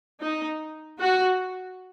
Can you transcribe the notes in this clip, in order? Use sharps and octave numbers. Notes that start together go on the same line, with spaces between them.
D#4
F#4